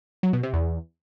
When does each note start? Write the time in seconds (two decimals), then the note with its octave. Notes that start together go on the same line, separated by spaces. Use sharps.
0.23 F#3
0.33 B2
0.43 C3
0.53 E2